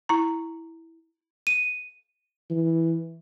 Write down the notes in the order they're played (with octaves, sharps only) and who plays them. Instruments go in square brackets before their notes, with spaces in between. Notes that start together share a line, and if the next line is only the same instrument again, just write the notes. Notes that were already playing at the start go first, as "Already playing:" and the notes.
[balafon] E4 A#5
[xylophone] D#7
[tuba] E3